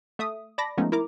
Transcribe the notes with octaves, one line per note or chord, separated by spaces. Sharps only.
A3 E5 D#6
D5 A5 B5 D6 A#6
F3 G#3 A3 B3 C#4 D#4
E4 A#4 A#5 D6